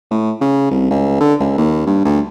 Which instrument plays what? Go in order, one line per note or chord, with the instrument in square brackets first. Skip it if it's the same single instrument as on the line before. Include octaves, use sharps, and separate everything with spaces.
[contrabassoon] A2
C#3
C2
C#2
D3
C#2
D#2
G2
D2